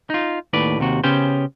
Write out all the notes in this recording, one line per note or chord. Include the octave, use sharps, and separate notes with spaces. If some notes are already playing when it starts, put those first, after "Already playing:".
D#4 F4
D#2 A2 B4 D5
D#2 C3 F#4
C#3 B3 C#4 G4 C5